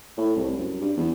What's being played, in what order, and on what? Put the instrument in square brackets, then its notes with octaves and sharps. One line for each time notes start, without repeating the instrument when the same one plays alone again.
[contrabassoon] A2
C2
F#2
G2
E2